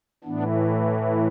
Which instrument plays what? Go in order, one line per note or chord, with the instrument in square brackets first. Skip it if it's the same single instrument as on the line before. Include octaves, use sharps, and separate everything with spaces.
[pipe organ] A2 E3 B3 D4